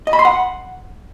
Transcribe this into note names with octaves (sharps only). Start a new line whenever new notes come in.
D#5
B5
C6
F#5